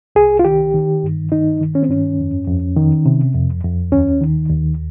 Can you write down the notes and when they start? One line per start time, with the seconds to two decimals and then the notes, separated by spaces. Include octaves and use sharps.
0.15 C2 G#4
0.39 F4
0.45 D#3 G4
0.74 D#3
1.03 G2
1.32 D#3 D#4
1.61 D#3
1.75 C#4
1.83 C4
1.89 G2 C#4
2.19 F2
2.48 F2
2.76 D#3
3.06 C3
3.34 F2
3.64 F2
3.92 D#2 C#4
4.21 D#3
4.49 D#2